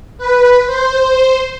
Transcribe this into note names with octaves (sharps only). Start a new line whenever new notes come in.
B4
C5